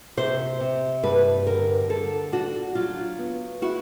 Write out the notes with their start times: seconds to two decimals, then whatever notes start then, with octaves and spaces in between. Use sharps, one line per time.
0.17 C3 C5
0.60 C3
1.03 G2 B4
1.46 D3 A#4
1.89 D3 A4
2.32 D4 F#4
2.75 F#3 F4
3.19 B3
3.62 E4 F#4